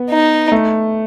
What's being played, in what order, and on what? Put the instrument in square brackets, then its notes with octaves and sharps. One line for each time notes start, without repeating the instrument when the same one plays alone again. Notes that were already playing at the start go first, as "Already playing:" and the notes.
Already playing: [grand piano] B3
[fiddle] D#4
[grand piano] A3